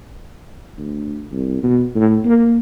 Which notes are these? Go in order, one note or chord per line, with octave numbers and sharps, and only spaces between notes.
D2
C2
B2
A2
A#3